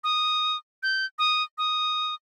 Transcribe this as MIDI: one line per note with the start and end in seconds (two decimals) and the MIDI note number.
0.04 0.57 87
0.83 1.06 91
1.19 1.43 87
1.58 2.14 87